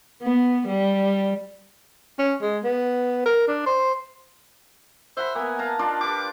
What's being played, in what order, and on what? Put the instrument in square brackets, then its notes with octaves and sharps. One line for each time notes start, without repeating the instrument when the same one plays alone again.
[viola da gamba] B3
G3
[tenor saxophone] C#4
G#3
B3
A#4
D4
C5
[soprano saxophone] C5 [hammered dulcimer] E5 F#5 B5
[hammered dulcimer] A#3 B3 [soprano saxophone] G#5
[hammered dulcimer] F5 A5 A#5
[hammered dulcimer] D4 F4 D5 [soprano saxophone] D#4
[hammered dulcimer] G4 B4 [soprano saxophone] D6